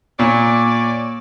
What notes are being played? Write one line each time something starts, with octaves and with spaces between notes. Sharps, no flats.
A#2 C#5 D5